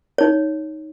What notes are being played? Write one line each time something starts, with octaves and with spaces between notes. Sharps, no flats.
D#4 C#5